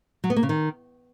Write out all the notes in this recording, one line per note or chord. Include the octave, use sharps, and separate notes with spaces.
F#3
B3
A#3
C#3
D#3